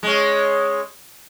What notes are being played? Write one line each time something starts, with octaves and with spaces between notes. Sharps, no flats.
G#3 C#4